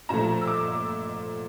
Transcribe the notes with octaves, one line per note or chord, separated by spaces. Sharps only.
A#2 F3 A3 A#5
E6
D6